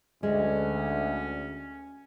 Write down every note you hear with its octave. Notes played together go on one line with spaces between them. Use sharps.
D2 G#3 C#4